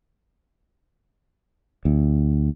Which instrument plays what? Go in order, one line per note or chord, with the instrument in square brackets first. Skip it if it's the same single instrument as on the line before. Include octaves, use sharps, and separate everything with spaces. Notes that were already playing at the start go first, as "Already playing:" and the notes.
[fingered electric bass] D2